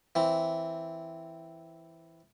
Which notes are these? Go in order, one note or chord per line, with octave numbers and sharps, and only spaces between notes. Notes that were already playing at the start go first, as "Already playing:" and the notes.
E3 C4